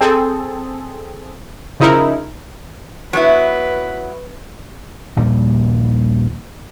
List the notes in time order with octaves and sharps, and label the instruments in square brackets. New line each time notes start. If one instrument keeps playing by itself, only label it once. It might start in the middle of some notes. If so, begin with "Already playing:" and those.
[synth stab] C4 G#4 A4
C#3 F3 D#4 E4 A#4
[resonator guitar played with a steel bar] F#3 B3 E4 [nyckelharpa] B4
[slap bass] A#1 D#2 A#2 G3